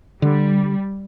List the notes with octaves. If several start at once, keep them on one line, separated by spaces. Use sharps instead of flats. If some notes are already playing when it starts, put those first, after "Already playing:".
D3 G3